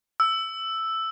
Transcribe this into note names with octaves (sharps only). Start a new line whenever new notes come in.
E6